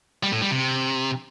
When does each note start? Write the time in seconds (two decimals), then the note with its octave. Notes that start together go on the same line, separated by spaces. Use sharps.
0.23 G3
0.32 A2
0.42 G3
0.51 C3